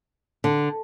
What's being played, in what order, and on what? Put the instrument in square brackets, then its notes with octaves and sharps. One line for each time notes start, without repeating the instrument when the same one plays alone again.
[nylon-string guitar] D3